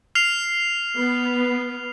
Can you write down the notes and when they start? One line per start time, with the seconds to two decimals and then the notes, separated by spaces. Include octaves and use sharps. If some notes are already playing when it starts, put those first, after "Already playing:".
0.15 F6 C7 F7
0.96 B3